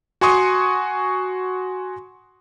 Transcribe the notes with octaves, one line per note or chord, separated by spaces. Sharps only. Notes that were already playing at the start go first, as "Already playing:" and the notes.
F#4 G#5 C6 C#6 D#6